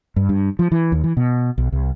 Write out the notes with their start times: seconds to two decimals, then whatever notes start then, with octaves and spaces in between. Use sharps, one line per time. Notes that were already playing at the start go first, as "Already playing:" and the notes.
0.16 G2
0.29 G2
0.59 F3
0.72 E3
0.92 D#2
1.04 E3
1.17 B2
1.58 B1
1.72 C2